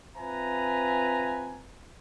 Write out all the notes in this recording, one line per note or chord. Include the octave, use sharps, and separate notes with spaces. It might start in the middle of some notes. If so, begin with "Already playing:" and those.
C4 F4 B4 E5 G#5 A#5